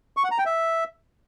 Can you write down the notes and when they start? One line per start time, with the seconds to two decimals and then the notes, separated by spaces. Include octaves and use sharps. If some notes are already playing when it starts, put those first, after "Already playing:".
0.17 C#6
0.24 F#5
0.31 A#5
0.38 G5
0.46 E5